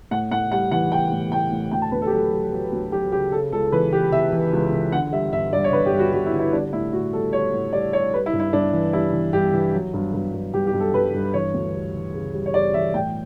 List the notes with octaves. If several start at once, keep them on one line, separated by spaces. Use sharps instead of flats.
A2 F#5
A2 F#5
G3 F#5
E3 F#5
G3 G5
A2
A2 G5
A2
D2 G5
A5
D2 B4
A4
G4
F#3 A4
F#3
F#3
D2
F#3 G4
C#3 G4
C#3 A4
C#2 A4
E3 B4
E3 G4
E3 E5
E3
C#2
E3
D3 F#5
G3 E5
G2 E5
G2 D5
C#5
D3 B4
G4
G2
F#4
G2 F#4
E4
D3
E4
G3 D4
A2 E4
A2 F#4
G3 A4
G3 C#5
A2
G3 D5
G3 C#5
G3 B4
E4
G2
E4
G2 D4
E3
G3 E4
E3
G2 G4
E3
F#3
G2
G2
G2
G2 G4
G4
G2
A4
G2 B4
G2
E3 C#5
D2
G3
E3
C#3
G3
C#5
G3 D5
E3 E5
A2 G5